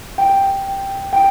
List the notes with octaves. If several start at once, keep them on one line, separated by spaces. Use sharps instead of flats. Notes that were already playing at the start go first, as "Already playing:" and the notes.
G5
G5